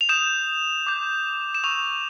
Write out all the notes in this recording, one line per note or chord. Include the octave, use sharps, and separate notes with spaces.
F7
D#6 G6 E7
D6 G6
E7
C#6 E6 G6 F7